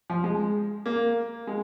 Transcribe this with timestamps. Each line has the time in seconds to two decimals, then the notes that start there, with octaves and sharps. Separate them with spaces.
0.10 F3
0.24 G#3
0.86 A#3
1.47 G#3